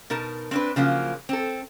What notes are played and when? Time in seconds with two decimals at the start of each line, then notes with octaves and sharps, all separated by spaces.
0.10 B2 D#4 A#4 A5
0.51 C4 D4 B4
0.76 C#3 F3 F#3 A#3
1.29 C4 A4